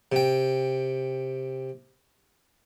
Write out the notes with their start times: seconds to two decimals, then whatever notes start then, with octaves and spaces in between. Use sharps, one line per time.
0.12 C3 G5